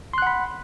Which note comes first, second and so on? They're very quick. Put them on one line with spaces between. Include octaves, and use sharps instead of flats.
C6 F#6 F#5 B5